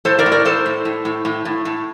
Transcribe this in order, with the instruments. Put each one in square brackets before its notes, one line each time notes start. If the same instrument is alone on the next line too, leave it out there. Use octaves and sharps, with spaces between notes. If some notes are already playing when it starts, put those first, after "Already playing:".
[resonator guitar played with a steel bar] A2 A4 C5
A#4 D5
A2
A#4 D5
A2 A4 C5
A2
A2
A2
A2
A2
A2